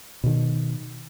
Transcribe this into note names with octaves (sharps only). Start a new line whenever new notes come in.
B2 D#3